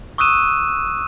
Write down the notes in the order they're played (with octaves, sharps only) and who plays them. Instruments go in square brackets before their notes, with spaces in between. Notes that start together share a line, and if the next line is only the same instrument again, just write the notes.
[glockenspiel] C#6 D#6 E6 F#6 D#7 E7